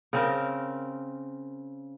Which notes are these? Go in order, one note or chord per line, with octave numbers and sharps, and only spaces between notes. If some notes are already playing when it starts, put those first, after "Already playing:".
C#3 C4 A#4